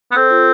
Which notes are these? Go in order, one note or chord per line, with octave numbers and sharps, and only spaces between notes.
B3
C4 A4 C5
F4 A4